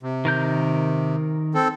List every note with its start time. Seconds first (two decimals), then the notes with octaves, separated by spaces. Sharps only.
0.03 C3
0.25 D#3 A#4 G6
1.54 C4 A4